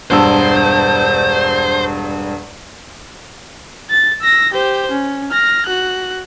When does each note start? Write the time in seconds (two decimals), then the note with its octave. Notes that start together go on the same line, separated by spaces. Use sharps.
0.11 E1 G2 C5 E6
3.90 A6
4.21 E6 A#6
4.53 G4 C5
4.92 C#4
5.31 F6 A#6
5.67 F#4 F#6